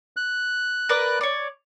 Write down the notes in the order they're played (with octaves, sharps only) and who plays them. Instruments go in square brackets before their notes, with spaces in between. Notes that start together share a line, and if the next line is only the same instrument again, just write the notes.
[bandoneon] F#6
[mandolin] A#4 B4 D5
C#5 D5